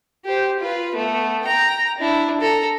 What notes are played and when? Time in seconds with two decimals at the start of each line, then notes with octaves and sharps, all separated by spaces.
0.25 G4 C5
0.60 F4 B4
0.95 A3 B3
1.44 G5 A#5
1.98 D4 E4
2.41 A4 A#5